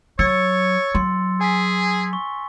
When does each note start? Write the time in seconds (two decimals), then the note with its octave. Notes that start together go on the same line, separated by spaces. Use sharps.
0.19 F#3 C#5 E6 A6 C#7
0.95 F#3 C6
1.41 G#4 G#5 B6
2.13 C#6